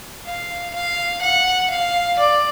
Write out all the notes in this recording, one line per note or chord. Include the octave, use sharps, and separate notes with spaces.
F5
F5
F#5
F5
D5